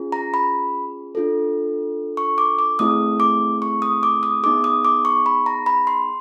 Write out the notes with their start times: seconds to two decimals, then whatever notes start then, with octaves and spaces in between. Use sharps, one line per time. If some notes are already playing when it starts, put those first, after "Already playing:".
Already playing: C#4 F4 G#4
0.12 A#5
0.34 B5
1.15 D4 F4 A4
2.17 C#6
2.38 D6
2.59 D6
2.79 A3 C4 E4 G#4 D#6
3.20 D6
3.62 C#6
3.82 D#6
4.03 D6
4.23 D#6
4.43 B3 D#4 G#4 D6
4.64 D#6
4.85 D6
5.05 C#6
5.26 B5
5.46 A#5
5.66 B5
5.87 C6